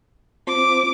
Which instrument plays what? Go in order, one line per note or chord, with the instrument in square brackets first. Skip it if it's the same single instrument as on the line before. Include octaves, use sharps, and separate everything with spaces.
[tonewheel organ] C4 F4 C5 [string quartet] D6